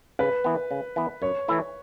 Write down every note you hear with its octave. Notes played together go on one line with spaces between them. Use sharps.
C#3 B4
E3 B3
C#3
E3 B3
F#2 C#5
E3 A3 E4 A4